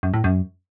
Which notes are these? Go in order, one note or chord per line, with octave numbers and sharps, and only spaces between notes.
F#2
A2
F#2